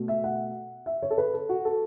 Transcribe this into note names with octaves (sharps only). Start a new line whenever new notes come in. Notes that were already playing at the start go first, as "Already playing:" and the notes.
Already playing: B2 A3
E5
F#5
E5
C#5
A4
B4
A4
F#4
A4